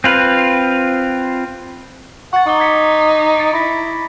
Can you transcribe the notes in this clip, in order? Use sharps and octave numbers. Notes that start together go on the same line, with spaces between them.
C4 F4 B4
F#5 C#6 A6
D#4 A#5 D6 G7
G#6 B6 C#7
A6 C#7 D7
E4 B5 A#6 B6